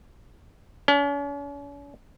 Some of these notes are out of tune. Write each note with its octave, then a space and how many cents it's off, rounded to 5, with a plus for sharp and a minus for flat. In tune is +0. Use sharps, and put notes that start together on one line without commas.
C#4 +45